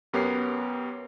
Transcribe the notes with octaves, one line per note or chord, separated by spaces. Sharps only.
F#2 B3 G4 A#4 C#5 C7